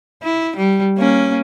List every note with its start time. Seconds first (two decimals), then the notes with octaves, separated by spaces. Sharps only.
0.23 E4
0.57 G3
0.98 A#3 C#4